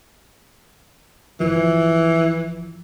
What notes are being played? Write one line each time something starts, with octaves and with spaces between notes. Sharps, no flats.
G1 E3 F3